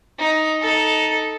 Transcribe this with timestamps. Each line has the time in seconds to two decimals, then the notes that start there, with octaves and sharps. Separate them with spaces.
0.18 D#4
0.61 D#4 A4